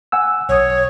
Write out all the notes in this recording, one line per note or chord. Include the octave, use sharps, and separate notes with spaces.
F#5 G#5 E6
B1 C#5 D#6